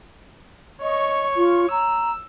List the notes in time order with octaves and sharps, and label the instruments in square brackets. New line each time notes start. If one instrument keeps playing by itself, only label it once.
[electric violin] C#5 C#6 [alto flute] D#5
[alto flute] F4
[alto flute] A#5 [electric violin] E6